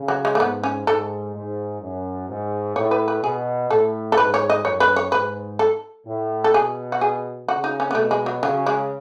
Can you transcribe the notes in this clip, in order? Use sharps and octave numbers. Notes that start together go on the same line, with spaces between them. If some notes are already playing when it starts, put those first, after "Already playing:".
Already playing: C#3
F#3
G#3
A3
G#2 B3
C#4
G#2 A4
G#2
F#2
G#2
A2 C#5
B4
B4
B2 G#4
A2 A4
A4
G#2 B4
C#5
D#5
F#2 C#5
B4
C#5
G#2 B4
A4
A2
A4
B2 G#4
F#4
G#4
C#3 F#4
D#4
C#4
B3
B2 A3
G#3
F#3
C#3 F#3
G#3